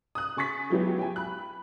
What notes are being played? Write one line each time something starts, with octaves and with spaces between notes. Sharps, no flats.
D#6 F#6
C#3 G#5 C#6 A6 B6
F3 F#3 G#3 B3 E4 G4
G5 G#5
B5 F#6